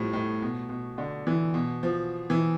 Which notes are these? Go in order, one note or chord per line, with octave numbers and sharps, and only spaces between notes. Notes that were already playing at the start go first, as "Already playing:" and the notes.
Already playing: A2 F3 G3
A2
B2
B2
D3
E3
B2
F3
E3